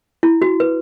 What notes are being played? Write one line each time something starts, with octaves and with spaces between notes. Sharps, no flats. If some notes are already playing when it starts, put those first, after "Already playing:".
E4
F#4
B4